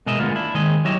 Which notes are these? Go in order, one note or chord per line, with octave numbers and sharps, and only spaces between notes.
B2 G#3 A#4 D#5 E5
D2 G#3 A#3 B3 F4
D4 E4
D#2 D#3 G#3 G#4 D#5
F#3 E4 G4 C#5 D#5 E5